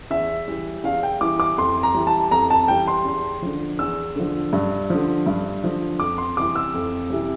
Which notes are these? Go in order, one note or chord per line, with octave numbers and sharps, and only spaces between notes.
E2 E5
E3 G3
E2 F5
G5
E3 G3 D6
D6
F2 C6
A#5
E3 G3
A5
F2 A#5
A5
E3 G3 G5
C6
E2
D3 F3
E2 E6
D3 F3
G2
D3 F3
G2
D3 F3
F2 D6
C6
C3 E3 G3 D6
E6
F2
C3 E3 G3